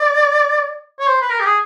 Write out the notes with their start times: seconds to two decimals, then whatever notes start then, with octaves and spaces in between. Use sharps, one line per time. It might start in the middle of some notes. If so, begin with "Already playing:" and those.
Already playing: D5
0.99 C#5
1.08 C5
1.21 B4
1.30 A#4
1.40 G4
1.45 G#4